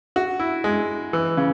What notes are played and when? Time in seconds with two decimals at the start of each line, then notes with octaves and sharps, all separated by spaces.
0.16 F#4
0.39 E4
0.64 G#3
1.13 E3
1.37 C#3